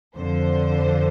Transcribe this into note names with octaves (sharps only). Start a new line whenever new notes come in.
F2 D3 F3 C5